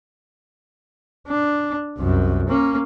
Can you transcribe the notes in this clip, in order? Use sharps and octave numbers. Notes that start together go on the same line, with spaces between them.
D4
C2 F#2
A#3 C#4